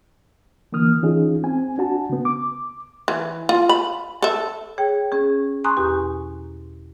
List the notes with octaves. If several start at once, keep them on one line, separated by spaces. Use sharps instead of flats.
D3 E3 A#3 D#6 F6
E3 C#4 D#4 F4 G#4
C4 G#5
D4 F#4 A5
C#3 B3
D6
E3
F4
B5
A4 E5
G#4 C#5 G5
C#4 G#4
G#5 A#5 C6 C#6 D#6 F#6
E2 B2 G4